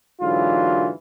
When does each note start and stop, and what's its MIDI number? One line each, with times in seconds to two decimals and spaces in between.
0.21 0.90 44
0.21 0.90 50
0.21 0.90 52
0.21 0.90 54
0.21 0.90 65